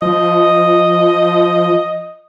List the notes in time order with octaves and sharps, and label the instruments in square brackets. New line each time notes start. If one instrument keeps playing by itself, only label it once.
[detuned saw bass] F3 [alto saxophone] D#5